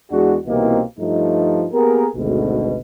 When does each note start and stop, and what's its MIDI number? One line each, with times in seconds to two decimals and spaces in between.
0.11 0.37 40
0.11 0.37 56
0.11 0.37 62
0.11 0.37 66
0.46 0.80 36
0.46 0.80 47
0.46 0.80 52
0.46 0.80 58
0.46 0.80 60
0.46 0.80 63
0.99 1.66 43
0.99 1.66 53
0.99 1.66 57
0.99 1.66 63
1.73 2.07 58
1.73 2.07 59
1.73 2.07 67
1.73 2.07 68
1.73 2.07 70
2.16 2.77 32
2.16 2.77 38
2.16 2.77 47